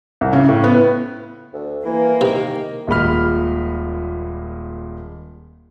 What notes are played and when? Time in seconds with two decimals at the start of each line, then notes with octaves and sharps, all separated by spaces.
0.21 C2
0.33 C#3
0.49 A2
0.64 B3
1.53 D2
1.85 E3 A#3
2.21 C3 D#3
2.87 D#1 A#2 G#3 B5 F6